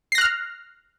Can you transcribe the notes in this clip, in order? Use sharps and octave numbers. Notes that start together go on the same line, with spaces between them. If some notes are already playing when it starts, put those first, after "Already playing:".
F6 F#6 A#6 C7